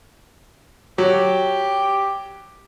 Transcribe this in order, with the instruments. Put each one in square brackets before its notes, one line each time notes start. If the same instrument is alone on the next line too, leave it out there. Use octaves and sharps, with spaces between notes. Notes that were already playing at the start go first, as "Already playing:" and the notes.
[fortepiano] F#3 [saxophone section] G4